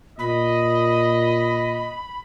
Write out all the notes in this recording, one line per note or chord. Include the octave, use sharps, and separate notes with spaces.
A#2 D#5 B5